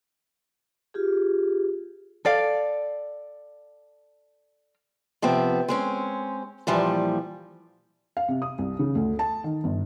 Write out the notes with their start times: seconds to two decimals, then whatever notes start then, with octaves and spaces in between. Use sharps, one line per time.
0.94 F4 G4 G#4
2.25 A4 D5 F5
5.22 C3 F3 B3 C4
5.68 G#3 C4 C#4
6.67 A#2 E3 F3 G3
8.17 F5
8.28 C3
8.42 D#6
8.59 C2
8.79 C#3
8.95 D2
9.19 A5
9.44 D#3
9.64 G1